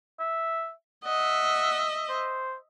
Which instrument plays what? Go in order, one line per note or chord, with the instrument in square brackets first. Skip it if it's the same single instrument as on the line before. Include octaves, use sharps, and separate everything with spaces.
[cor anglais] E5
[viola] D#5 E5 [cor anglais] F#5
[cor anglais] C5